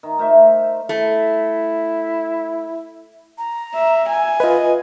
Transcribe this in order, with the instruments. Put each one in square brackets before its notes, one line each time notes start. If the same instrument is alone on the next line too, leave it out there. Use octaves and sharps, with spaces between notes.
[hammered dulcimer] D#3
A3 A#4 C5 E5
[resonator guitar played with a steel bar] A3 [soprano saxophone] E4
[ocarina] A#5
[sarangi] E5
G#5
[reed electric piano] F4 B4 [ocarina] D#5